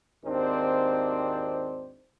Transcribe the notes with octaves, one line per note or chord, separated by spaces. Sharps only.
G#1 D#2 D#3 C4 D4 C5